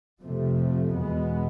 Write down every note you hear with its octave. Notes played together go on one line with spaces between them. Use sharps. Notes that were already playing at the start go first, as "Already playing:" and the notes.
F2 C3 F3 A3
E2 B2 G#3 B3